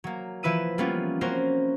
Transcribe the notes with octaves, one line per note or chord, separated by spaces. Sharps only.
F#3 A#3
E3 F3 E4 B4 E6 D#7
G3 A#3 B3 C#4 F4
A#3 C4 C#4 F#4 A#4 C5